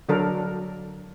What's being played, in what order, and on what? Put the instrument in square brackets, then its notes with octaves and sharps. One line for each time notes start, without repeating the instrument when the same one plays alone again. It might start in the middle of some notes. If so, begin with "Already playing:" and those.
[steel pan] D3 F#3 D4 A4 A#4